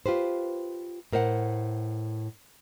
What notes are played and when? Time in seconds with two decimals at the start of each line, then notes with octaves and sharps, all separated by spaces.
0.06 F4 G4 B4 C5
1.12 A2 A#4 C5 E5 F#5